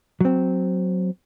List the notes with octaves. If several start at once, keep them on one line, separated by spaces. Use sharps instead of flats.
F#3 C4